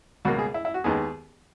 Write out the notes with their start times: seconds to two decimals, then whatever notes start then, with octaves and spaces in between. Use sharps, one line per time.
0.25 C#2 B2 A#3 F#4
0.39 G#4
0.54 E4
0.65 E4
0.74 F#4
0.84 D#2 D#3 G#3 B3 G#4